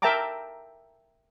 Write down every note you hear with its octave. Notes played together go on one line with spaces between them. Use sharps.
A#4 E5 G5 A5 A#5 D6